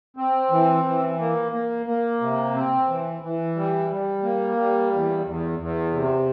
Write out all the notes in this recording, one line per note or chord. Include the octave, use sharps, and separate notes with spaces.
C4
E3
E3
A#3
A#3
A#3
C3
C4
E3
E3
G3
G3
A#3
G3
E2
E2
E2
C3